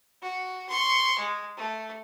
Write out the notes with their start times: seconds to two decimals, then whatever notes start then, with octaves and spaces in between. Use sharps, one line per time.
0.22 F#4
0.69 C6 C#6
1.19 G#3
1.57 A3